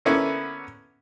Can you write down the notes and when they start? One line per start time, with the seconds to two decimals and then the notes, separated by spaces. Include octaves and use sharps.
0.05 D3 A#3 B3 C#4 E4